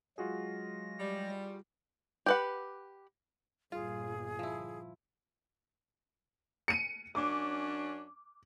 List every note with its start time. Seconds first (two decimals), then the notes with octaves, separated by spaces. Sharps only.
0.18 F#3 G#3 F4 F#4 G#4 A#6
1.00 G3
2.26 G4 B4 F#5
3.72 G1 A#2 F4 G#4
4.39 F3 E4
6.68 C#7 D#7
7.15 F#2 C#4 D4 D6